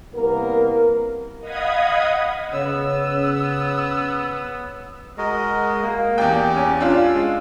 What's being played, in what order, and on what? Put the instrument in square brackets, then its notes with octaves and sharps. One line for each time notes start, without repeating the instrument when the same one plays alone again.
[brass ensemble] C2 A#3 B3 A#4
[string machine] D#5 F5 F#5 B5 D#6 G#6
[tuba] C#3 [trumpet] B3 [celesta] C#5 [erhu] E6
[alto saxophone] G#3 [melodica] F#4 A#4 D#5
[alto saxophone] A#3
[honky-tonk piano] E2 G5 [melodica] G4 D5
[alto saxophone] C#4
[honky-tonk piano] D4 F4 [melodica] E6
[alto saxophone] G#3